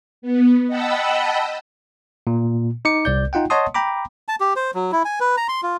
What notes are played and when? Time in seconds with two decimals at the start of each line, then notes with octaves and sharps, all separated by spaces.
0.22 B3
0.68 D#5 F#5 G5 A5 B5 E6
2.27 A#2
2.85 D#4 D6 C#7
3.05 C2 D5 G6
3.33 D#4 F4 F#5 G5
3.50 C#5 D#5 F#5 A5 C6 D#6
3.74 G5 A#5 B5 D6
4.28 A5
4.40 G4
4.56 C5
4.74 F#3
4.92 E4
5.05 G#5
5.20 B4
5.37 A#5
5.49 C6
5.63 F4